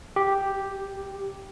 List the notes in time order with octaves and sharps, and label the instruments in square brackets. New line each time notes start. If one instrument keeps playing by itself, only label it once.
[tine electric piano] G4